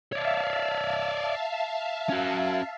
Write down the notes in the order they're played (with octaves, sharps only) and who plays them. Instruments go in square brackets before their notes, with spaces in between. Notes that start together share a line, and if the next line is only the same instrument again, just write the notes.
[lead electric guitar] C#5 D5 [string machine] E5 F5 A5
[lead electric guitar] C#4 F#4